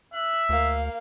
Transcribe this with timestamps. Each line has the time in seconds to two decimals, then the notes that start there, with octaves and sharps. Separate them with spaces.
0.14 E5 F#6
0.49 D2 A#3 F5